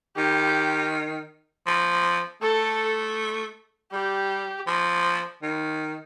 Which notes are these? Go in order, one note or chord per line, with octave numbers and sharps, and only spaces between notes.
D#3 G4
F3
A3 A4
G3 G4
F3
D#3